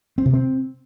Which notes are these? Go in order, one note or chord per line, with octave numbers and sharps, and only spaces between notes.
C4
C3
C4